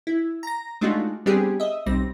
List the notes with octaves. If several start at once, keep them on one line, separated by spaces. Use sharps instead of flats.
E4
A#5 A#6
G#3 A3 D4 D#4 F4 F#4
G3 B3 C4 D4 G4 G#4
D#5 E5
B1 G3 C4 A#6